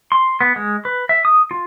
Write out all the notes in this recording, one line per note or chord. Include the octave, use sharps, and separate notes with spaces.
C6
B3
G#3
B4
E5
D#6
F4